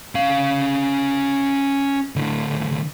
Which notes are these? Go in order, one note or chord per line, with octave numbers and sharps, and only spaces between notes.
C#4 F5
A2 D3